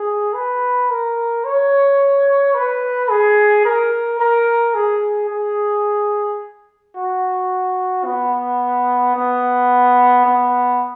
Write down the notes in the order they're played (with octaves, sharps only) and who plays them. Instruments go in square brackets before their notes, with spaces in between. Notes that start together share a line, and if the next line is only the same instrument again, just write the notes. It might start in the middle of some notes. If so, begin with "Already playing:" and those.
Already playing: [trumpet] G#4
B4
A#4
C#5
B4
G#4
A#4
A#4
G#4
G#4
F#4
B3
B3
B3